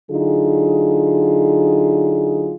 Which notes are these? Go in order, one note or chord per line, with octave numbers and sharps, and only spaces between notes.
D3 F#3 D#4 F4 G#4